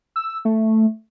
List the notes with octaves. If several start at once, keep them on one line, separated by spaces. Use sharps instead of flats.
E6
A3